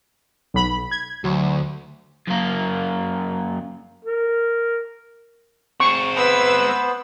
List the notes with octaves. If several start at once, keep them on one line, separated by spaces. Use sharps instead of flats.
B1 B5
G#6
D2 F#3
F#2 A#3
A#4
C4 G#4 C#6
B3 B4 C5 E6